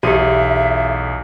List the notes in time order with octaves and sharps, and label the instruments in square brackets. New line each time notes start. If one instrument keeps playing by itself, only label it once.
[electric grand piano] B1 E2 D#7 [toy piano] F#4 G4 [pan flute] E5